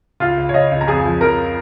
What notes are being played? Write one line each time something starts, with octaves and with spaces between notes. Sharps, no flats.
C#2 F4 F5
C#2
C#5
C#2 D#5
C#2
A#5
F2 G#4 G#5
F3
F2 A#4 A#5